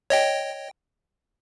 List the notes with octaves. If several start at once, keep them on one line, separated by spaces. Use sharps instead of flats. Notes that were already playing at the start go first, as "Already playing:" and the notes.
C#5 D#5 G5